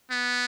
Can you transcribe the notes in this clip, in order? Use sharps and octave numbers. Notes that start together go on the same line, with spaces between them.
B3